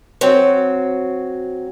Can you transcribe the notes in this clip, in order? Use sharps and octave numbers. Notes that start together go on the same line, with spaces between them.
F#3 C4